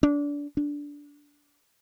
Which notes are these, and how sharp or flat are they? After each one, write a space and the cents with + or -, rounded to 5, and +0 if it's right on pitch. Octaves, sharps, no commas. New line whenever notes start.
D4 -25
D4 -15